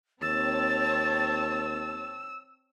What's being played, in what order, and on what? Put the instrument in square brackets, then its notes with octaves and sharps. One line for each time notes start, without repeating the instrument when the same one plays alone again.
[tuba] D#2 [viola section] C4 C#5 A5 [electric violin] E6 [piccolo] A6